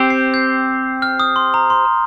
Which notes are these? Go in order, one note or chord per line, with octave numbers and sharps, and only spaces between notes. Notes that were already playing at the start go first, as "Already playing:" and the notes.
Already playing: C4 G4 C5
C7
G6
F6
D#6
C6
A#5
C6